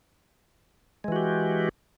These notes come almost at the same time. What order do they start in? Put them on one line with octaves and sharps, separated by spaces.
G#3 E3 F#4 G4